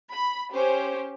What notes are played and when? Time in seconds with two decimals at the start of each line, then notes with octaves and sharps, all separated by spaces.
0.12 B5
0.54 C#4 G4 C5